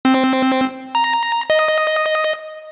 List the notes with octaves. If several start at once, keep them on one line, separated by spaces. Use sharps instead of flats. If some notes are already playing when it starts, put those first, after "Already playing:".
C4
A#5
D#5